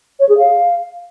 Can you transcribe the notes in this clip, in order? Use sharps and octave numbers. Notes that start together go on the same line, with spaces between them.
C#5
G#4
F5